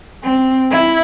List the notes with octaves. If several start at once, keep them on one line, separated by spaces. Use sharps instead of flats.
C4
E4